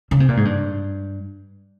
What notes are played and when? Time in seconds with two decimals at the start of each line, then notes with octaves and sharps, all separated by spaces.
0.11 C#3
0.20 C3
0.29 A#2
0.37 G#2
0.45 G2